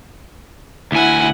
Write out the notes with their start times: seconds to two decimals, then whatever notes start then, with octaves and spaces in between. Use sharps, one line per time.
0.92 D2 E4 F#5 G#5